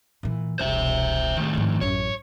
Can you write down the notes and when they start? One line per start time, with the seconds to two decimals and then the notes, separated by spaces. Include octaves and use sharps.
0.23 A#2 E3
0.59 E1 C2 C5 E5
1.37 A2 D#3 G#3
1.55 G#2 F3
1.81 A1 F#2 C#5